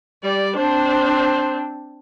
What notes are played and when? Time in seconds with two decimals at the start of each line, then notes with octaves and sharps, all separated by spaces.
0.24 G3 D5
0.57 C4 D4 C5